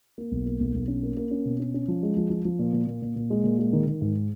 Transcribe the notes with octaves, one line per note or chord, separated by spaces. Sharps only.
A#3
B1
A#3
B1
B1
C#4
A#3
A#3
C#4
B2
C#4
C#4
F3
G#3
F3
F3
F3
A#2
A#2
A#2
A#2
A#2
G#3
A#2
G#3
D#3
D#3
G#2